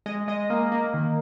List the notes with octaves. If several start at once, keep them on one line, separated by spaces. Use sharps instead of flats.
G#3 D#5
G#3 D#5
A#3
A#3
D#3